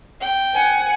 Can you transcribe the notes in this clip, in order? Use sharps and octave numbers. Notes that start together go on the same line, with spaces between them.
G5
F#5 G#5